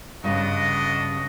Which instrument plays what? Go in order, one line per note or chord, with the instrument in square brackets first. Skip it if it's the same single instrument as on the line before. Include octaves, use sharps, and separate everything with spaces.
[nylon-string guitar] G2 A#2 C#3 [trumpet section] D4 F#4 D#5